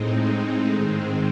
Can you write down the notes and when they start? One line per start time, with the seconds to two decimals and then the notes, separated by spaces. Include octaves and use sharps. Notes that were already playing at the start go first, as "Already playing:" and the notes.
Already playing: A2 G#3 C4 D#4
0.73 G#2 D#3 G#3 C4